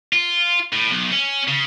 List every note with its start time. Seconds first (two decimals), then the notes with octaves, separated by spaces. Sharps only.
0.13 F4
0.73 A2
0.91 B1
1.11 C#4
1.48 C#3